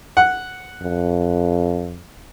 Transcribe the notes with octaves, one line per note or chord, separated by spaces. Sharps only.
F#5
F2